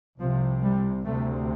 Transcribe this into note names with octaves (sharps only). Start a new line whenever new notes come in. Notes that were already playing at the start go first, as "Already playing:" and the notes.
C2 C3 F3
G3
D2 C3 A3